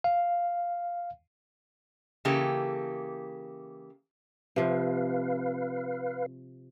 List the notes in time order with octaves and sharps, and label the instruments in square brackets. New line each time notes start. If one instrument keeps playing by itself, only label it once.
[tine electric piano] F5
[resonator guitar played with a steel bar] C#3 E3 A#3 G4 A4
[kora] C3 F3 [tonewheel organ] B4 F5